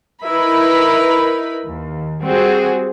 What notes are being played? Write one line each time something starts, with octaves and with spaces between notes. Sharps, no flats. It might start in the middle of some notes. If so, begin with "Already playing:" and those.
D#4 E4 A#4 B4 B5
D#2
G3 C4 F#4 G#4